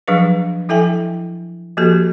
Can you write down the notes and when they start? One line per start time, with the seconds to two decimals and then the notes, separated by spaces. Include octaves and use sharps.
0.08 F3 F#3 D4 G#4 B4
0.69 F3 E4 A4 E5 G5 G#5
1.77 F3 A#3 F#4 G4 A4